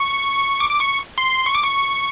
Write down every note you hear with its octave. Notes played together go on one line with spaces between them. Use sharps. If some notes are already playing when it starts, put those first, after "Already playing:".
Already playing: C#6
D6
D6
C#6
C6
C#6
D6
C#6